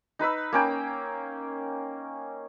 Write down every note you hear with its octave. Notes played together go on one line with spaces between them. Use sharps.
D#4 B4 B5 E6
A#3 C#4 G5